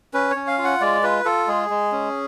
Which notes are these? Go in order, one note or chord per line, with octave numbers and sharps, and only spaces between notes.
C#4 B4
C#5
C#4
F5
F4
F#5
G#3 D5
F4 B4
F4 A4
G#3 G#4
G#3
C#4